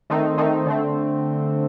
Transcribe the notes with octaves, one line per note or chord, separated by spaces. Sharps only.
D#3 A3 C4 D#4
D#3 A3 C4 D#4
D3 A3 C4